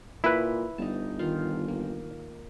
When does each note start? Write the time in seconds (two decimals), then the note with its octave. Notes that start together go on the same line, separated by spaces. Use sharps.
0.24 A#2 E4 B4
0.78 G1 D#4 A5
1.19 D#3 F4 F5
1.68 A#3